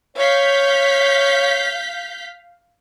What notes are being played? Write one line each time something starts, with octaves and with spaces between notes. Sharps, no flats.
C#5 F5 G6 B6